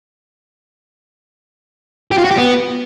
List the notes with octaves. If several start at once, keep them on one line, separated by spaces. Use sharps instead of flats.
G4
F4
F#4
G4
B3